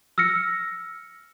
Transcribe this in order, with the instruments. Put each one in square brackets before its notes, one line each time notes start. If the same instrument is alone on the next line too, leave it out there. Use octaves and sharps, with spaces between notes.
[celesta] E6 F6 A#6 C#7